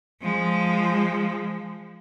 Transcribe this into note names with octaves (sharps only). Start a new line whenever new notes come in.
F3 G#3